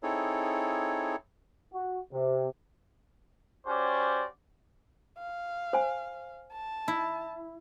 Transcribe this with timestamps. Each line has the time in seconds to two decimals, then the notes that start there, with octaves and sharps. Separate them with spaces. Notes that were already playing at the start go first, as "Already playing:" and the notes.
0.03 C4 D#4 E4 G#4 A4 C#5
1.73 F#4
2.13 C3
3.67 C#4 F#4 G4 C5 D5
5.19 F5
5.73 C5 G#5
6.53 A5
6.88 E4